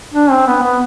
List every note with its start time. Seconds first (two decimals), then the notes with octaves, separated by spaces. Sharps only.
0.13 D4
0.30 C4
0.47 B3
0.63 B3